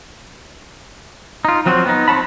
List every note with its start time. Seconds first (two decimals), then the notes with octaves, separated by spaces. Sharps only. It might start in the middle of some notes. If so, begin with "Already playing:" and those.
1.45 D#4 F4
1.66 F3 F#3 C4 F4 F#4
1.86 B3 D#4
2.08 C4 C5 C#5 A5 B5